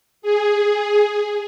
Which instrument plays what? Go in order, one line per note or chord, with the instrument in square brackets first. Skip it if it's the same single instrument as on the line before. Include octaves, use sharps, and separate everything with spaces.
[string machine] G#4